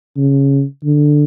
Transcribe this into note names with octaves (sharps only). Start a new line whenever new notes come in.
C#3
D3